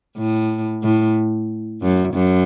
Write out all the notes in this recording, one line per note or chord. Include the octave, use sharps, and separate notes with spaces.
A2
A2
F#2
F#2